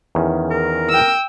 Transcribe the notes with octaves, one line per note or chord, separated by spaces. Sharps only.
E2 D#3 C#4
A#4
G5 E6